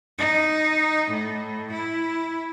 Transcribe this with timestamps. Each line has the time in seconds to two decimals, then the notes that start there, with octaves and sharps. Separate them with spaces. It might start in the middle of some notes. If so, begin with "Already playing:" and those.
0.18 D#4
1.10 A2
1.72 E4